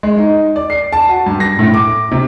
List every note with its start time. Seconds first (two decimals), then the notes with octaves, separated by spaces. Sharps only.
0.03 G#3
0.18 D#4
0.56 D5
0.70 C7
0.93 A5
1.09 F#4
1.26 G2
1.40 A#6
1.59 A2
1.74 D6
2.12 C3